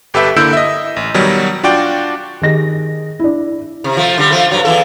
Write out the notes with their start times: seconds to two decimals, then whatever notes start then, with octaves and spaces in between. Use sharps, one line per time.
0.14 G1 G4 A4 B4 E5 G5
0.36 D3 A#3 E4 E6 G6 D7
0.53 D#5 E5
0.96 A1
1.14 B2 D#3 F#3 G3
1.63 D4 F4 F#4 D5 G5
2.42 D#3 G4 G#4 D#5 A#6
3.20 D4 E4
3.84 C3
3.97 F3 A3
4.18 D3 G3
4.31 F3 A3
4.51 G2 F#3
4.65 E2 E3 A4